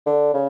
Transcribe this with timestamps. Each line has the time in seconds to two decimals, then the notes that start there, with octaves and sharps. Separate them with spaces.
0.06 D3
0.34 C#3